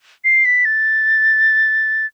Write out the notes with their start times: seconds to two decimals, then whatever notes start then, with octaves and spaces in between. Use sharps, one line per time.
0.24 C7
0.45 B6
0.65 A6